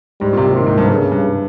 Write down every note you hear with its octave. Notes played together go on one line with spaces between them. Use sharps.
G#2 G3
A#2
C3
A#2 D#3
G#2
G2
G2 C#3
G2